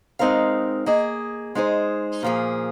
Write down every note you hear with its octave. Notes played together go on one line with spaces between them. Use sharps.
G#3 C4 D#4 A#4 F5
A#3 G#4 D#5
G#3 D#4 G#4 C5
A#2 F3 A#3 G#4